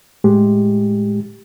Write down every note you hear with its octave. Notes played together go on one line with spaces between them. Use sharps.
A2 G#3 G4